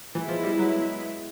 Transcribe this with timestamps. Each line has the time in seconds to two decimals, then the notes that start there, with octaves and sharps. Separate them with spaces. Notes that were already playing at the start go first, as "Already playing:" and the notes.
0.14 E3 G#3 B3 E4
0.29 F3
0.43 G3
0.59 F#3